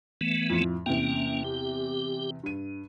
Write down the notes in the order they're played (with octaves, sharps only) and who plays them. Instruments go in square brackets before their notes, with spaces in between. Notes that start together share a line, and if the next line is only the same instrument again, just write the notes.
[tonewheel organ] E3 A3 B3
[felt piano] F2 A2 F3
[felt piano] E2 C3 G5 [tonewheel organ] A#3 C#4
[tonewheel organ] G4
[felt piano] G2 D#7